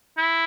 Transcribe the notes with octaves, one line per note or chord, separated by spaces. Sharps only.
E4